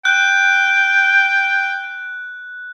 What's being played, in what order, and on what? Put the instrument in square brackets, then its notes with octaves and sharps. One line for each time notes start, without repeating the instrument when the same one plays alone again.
[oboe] G5 [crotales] F#6